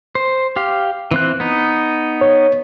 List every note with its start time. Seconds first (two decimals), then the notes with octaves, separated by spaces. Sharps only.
0.15 C5
0.56 G4 F5
1.11 E3 C4 F#6
1.40 B3 D#4
2.21 C#5